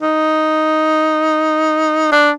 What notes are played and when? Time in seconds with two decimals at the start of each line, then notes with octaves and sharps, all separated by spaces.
0.01 D#4
2.12 D4